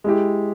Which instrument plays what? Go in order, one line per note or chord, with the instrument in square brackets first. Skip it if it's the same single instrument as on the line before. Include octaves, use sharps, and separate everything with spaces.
[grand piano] G#3 E4 G4